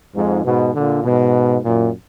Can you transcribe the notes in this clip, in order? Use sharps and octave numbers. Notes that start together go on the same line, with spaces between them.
F2 G#2
G#2 B2
A#2 D3
G#2 B2
F#2 A#2